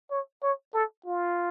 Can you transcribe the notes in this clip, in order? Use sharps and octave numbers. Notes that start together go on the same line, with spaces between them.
C#5
C#5
A4
F4